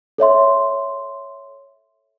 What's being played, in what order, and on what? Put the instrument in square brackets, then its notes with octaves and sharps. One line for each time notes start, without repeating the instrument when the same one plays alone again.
[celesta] A4 C#5 E5 C6